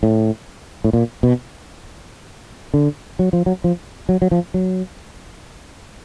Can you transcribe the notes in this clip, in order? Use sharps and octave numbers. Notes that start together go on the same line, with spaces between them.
A2
A2
A#2
B2
D3
F#3
F3
F#3
F3
F#3
F#3
F3
F#3